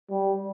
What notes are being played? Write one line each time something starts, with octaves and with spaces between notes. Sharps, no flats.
G3